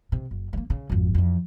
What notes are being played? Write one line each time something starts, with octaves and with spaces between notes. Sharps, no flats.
C3
F#1
G3 A#3
C#3
G#1 F2
F2 E3